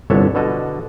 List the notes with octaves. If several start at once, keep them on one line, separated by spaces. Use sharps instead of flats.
G1 C2 D3 A4 C#5 E5
B2 D3 A4 D#5